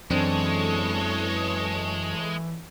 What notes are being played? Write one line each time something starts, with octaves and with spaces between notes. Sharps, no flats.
F#2 E3 G#3 C4 D4 A4 C#5